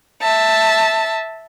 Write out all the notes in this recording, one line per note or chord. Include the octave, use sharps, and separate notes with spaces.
E5 A5